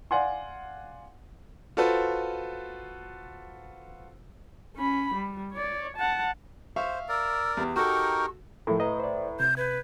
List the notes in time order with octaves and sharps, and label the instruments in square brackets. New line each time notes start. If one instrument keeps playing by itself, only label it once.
[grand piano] D5 F5 F#5 G#5 C6
F4 F#4 A4 B4 C5
[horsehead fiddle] C#4 B5
G3
C#5 D5
F#5 A5
[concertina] C5 [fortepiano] E5 F5 C#6
[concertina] A#4 D5 [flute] E6
[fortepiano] E2 [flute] G4
[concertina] D#4 A#4 G5 [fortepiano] F#4 A4 [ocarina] C#6
[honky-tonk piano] A2 [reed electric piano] F3 A4 A#4
[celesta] B4 E5 A#5 [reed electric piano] D#5
[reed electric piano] C5 D5
[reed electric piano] C3 [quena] G6
[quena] B4 [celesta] G6 G#6